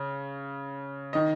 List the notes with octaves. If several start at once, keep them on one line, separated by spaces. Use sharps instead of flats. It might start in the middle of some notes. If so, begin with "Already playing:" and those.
Already playing: C#3
D#3 D#5